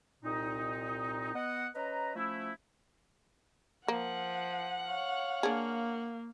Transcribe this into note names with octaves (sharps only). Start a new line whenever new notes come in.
C2 A#2 C4 D#4
B3 D#5 F#5
C#4 B4 D#5 A#5
F3 A3 C#4 E4
F3 A#3 F#5
C#5 F5
A#3 D4 G#4